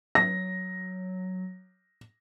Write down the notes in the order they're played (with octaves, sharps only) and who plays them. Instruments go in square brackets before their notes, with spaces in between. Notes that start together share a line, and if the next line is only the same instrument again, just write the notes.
[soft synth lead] F#3 [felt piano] A#6